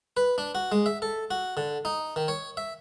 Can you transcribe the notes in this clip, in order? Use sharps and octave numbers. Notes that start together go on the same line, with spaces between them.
B4
D4
F#4
G#3
E5
A4
F#4
D3
D#4
D#3
C#5
E5